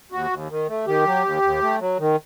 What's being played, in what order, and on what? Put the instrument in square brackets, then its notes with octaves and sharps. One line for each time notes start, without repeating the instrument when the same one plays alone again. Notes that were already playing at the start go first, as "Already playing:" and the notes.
[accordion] D#2 F#4
D#2
D#3
A3
D#3 G4
F#3
D#2
D#2
A3
F#3
D#3